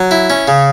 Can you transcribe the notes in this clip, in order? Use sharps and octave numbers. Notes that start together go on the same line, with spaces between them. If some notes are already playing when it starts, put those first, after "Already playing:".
Already playing: F#3
E4
C#4
C#3